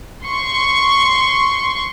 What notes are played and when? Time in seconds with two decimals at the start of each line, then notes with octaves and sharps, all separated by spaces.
0.24 C6 C#6